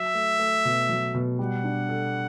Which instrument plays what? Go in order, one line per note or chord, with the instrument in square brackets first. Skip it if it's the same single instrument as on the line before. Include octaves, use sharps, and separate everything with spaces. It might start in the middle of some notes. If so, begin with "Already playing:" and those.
Already playing: [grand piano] F#3 [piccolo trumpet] E5
[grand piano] A3
A3
B2
F#3
B2
[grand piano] G3 [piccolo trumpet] F#5
[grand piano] D4
A4